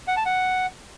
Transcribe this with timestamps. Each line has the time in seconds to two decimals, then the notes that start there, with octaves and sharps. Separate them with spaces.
0.08 F#5
0.17 A5
0.26 F#5